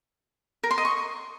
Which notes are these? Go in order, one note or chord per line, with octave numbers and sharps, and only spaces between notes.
A#4
C6
D#5
C#6